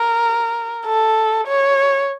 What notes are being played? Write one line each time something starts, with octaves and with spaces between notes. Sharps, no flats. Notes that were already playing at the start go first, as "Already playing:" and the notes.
Already playing: A#4
A4
C#5